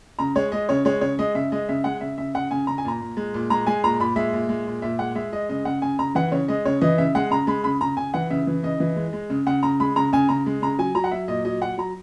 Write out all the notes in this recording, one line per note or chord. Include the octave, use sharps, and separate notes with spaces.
C#3 A#5
G#3 C#5
G#3 D#5
C#3 C#5
G#3 C#5
C#3 C#5
G#3 D#5
C#3 E5
G#3 D#5
C#3 E5
G#3 F#5
C#3 E5
C#3 E5
C#3 F#5
C#3 G#5
C#3 A#5
G#5
A#2 A#5
A#2
G#3
A#2
G#3 A#5
G#3 G#5
A#2 A#5
A#2 B5
G#3 E5
A#2
G#3
A#2
A#2 E5
G#3 F#5
G#3 E5
G#3 D#5
C#3 D#5
C#3 F#5
C#3 G#5
C#3 A#5
E3 F#5
C#3 C#5
G#3 D#5
C#3 C#5
E3 D#5
C#3 E5
G#3 F#5
C#3 A#5
G#3 B5
C#3 B5
C#3 A#5
C#3 G#5
E3 F#5
C#3 E5
E3
C#3 D#5
E3
G#3
G#3
C#3
C#3 F#5
C#3 A#5
G#3 B5
C#3 A#5
C#3 G#5
C#3 A#5
G#3
C#3 A#5
F#3 G#5
F#3 A#5
F#5
F#3 E5
A#2 D#5
F#3 D#5
F#3 F#5
F#3 A#5